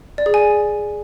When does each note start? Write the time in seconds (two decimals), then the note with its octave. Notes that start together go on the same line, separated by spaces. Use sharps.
0.18 D5
0.26 G#4
0.34 G#5